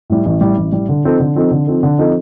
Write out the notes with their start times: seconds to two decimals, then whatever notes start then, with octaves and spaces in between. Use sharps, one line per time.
0.10 A2 G3
0.26 A1
0.41 A2 G3
0.57 A1
0.72 A2 G3
0.89 D3
1.04 F3 C4 D#4 A4
1.20 D3
1.35 F3 C4 D#4 A4
1.51 D3
1.67 F3 C4 D#4 A4
1.83 D3
1.98 F3 C4 D#4 A4